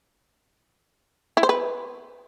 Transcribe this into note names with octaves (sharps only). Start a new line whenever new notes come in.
E4
C5
B4